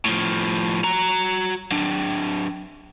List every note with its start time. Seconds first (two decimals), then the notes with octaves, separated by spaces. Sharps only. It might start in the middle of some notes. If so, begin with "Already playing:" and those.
0.05 A2 F3
0.84 F#4 A#5
1.71 F#3 D4